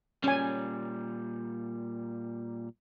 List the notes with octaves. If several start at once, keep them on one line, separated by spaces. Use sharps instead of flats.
A#2 G3 C#4 G#5